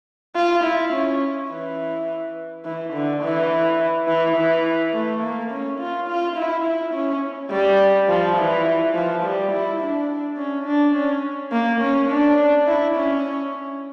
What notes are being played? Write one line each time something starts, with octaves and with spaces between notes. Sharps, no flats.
F4
E4
C#4
E3
E3
D3
E3
E3
E3
A3
A#3
C#4
F4
F4
E4
E4
C#4
G3
F3
E3
F3
G3
E4
D4
C#4
D4
C#4
A#3
C#4
D4
E4
C#4